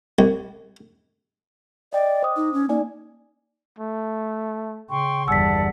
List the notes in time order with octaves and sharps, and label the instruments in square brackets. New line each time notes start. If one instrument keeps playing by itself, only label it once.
[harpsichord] C2
[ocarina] D5 [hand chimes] D#5 G5
[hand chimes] C5 D6 D#6
[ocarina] D#4
C#4
[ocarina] A#3 [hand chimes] D#4 D5 G#5
[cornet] A3
[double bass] C#3 [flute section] G5 C6 C#6
[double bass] G1 E2 [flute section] D5 F#5 [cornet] A5 [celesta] E6 B6